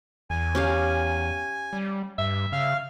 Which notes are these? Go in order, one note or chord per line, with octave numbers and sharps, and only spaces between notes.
E2 G#5
C#4 G4 F5
G3
G2 E5
C#3 F5 F6